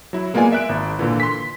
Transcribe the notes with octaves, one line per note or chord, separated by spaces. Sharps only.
F#3 E4
G#3 A#3 B3 F4 D5 G#5
E5 F#6 D7
G#1
A#2 D3 E3
C6 B6